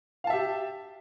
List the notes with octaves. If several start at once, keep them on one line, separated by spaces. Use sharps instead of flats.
G4 E5 F5 A5